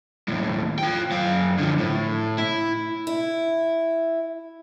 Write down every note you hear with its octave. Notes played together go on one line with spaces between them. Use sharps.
D#2 A2
F4 G5
F#2 F5
D3 F3
A2
E4
E4